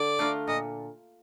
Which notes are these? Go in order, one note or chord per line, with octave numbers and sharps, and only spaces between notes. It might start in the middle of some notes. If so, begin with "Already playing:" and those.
Already playing: D3 A4 D5
A3 D4 F4 A#4
A#2 D#5